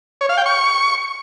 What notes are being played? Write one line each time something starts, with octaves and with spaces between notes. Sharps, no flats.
C#5
F5
G5
C#6